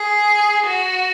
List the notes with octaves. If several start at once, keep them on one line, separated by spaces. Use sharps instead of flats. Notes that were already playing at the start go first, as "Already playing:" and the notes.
Already playing: G#4
F#4